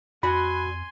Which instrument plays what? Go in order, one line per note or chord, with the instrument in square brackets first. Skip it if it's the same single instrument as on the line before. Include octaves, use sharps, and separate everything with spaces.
[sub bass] F2 [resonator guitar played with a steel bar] F#3 F#4 D5 [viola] G#5 C6 [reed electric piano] B5